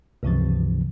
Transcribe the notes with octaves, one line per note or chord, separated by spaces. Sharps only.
C#2 G2 C3 E3 F3 C4